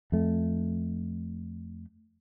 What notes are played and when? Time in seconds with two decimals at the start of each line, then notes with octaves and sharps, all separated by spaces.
0.12 F2 A3